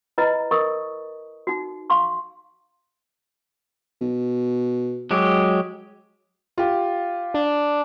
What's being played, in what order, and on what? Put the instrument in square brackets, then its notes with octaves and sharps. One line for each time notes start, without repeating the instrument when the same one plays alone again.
[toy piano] E4 B4 D#5 A#5 B5
A#4 D#5 C#6 D#6
D#4 F#4
F5 C6 C#6
[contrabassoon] B2
[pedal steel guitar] F#3 G#3 G4
[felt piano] F4 G4
[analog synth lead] D4